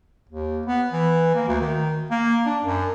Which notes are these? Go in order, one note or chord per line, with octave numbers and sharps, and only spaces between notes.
D#2
B3
E3
A#3
D2
D#3
A#3
D4
F#2